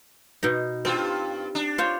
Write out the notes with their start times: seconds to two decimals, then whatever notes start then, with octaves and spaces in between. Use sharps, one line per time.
0.43 B2 D#4
0.85 G2 C4 F4
1.55 D4
1.78 F4 C5 C#5